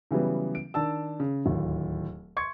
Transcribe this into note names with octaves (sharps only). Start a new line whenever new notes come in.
C#3 E3 F#3 G3 B3
D7
D#3 D4 A5 E6
C#3
D1 D#2
C6 C#6 G#6 C#7